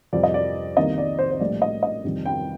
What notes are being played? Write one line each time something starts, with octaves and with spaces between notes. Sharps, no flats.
F2 C3 G3 D5
D#5
D5
C2 C3 D#3 A#3 D#5
D5
C5
C5
A#1 A2 G3 A#3 D5
D#5
D#5
F2 C3 D#3 G3
G5